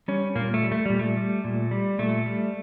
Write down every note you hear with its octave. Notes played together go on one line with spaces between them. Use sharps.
G3 C#4
A#2 A#3
A3
G3
A3
A#2 G3
A3
G3
A#2
G3
A#2 A3
G3